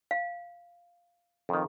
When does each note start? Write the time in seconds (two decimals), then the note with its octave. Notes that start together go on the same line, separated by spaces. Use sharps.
0.11 F5
1.49 F2 D#3